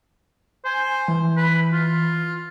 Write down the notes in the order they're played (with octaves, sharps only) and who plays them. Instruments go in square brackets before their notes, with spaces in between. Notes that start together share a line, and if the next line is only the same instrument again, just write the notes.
[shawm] C5 [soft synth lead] G#5
[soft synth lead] E3
[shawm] B4
F4